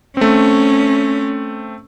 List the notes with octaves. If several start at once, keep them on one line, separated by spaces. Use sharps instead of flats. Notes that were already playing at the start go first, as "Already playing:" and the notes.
A3 C4 C#4